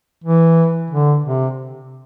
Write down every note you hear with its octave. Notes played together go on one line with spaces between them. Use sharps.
E3
D3
C3